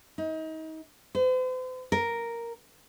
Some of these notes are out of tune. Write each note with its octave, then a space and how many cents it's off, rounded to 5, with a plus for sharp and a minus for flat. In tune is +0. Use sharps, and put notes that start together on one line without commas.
D#4 +30
C5 -45
A#4 +0